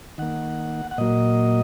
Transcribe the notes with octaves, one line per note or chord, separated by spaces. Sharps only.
D#3 A#3 F#5
F#5
A#2 F#3 A#3 D#5